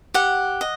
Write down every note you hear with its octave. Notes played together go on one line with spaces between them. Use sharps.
G4 F#5
D#5